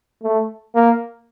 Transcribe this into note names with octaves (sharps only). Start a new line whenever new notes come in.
A3
A#3